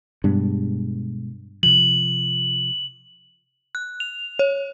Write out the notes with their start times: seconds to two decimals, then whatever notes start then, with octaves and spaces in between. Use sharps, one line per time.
0.24 G2 B2 G#3 B3
1.63 C3 F3 F#7
3.75 F#6
4.00 F7
4.39 C#5